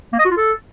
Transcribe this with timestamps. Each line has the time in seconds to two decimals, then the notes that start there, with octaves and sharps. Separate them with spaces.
0.13 A#3
0.19 D#5
0.25 F#4
0.31 F4
0.37 A4